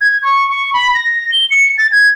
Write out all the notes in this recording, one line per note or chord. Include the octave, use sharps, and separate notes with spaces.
G#6
C#6
C#6
B5
A#6
G7
C#7
A6
G#6